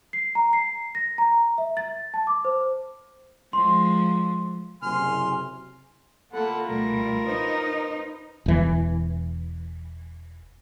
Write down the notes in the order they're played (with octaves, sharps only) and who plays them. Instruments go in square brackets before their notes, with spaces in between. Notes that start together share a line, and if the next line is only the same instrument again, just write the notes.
[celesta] C7
A#5
C7
A#6
A#5
E5
A6
A5
D6
C5
[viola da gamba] F3 G#3 [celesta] C6
[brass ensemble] F#1 C3 [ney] G#5 [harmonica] C6 [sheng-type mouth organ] F6
[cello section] A#3 [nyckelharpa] E4 F4 [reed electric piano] A4 B5 [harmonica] F#5 A5
[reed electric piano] C#2 B2 A3 [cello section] G3 [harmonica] A#4
[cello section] D#4 [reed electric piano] B4 C5
[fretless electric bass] E1 E3